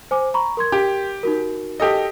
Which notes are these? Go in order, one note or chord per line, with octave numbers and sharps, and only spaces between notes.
C5 G#5 D6
A#5 B5 C#6
A#4 C6 G#6
G4
D#4 F#4 A#4
G4 A4 D#5